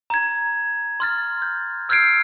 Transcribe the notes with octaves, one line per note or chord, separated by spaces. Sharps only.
A#5 G#6
C6 F6 A6
G6
E6 F6 G6 G#6 C7 D7